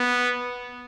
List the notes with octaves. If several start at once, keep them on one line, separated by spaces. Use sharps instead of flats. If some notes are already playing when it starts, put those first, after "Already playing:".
Already playing: B3